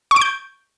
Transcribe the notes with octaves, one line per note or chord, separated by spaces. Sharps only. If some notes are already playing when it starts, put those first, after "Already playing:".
C#6
D7
G6